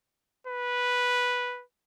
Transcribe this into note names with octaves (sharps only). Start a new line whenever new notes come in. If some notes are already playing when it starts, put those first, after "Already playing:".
B4